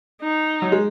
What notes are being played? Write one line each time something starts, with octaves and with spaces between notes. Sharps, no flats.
D#4
F#3
G#3